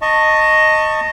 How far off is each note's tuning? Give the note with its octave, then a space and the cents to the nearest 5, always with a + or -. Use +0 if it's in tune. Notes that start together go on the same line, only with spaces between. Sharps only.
D#5 +0 A5 +25 C#6 -5